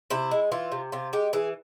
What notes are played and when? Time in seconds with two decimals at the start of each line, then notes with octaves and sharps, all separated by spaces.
0.10 C3 E4
0.31 G#3
0.52 E3 F4
0.72 C3
0.92 C3 F4
1.13 G#3 G4
1.33 E3 G#4